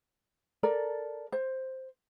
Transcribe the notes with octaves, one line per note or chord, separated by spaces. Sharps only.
A4 A#4 D5 A#5
C5